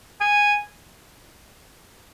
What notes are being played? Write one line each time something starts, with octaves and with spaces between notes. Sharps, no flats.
G#5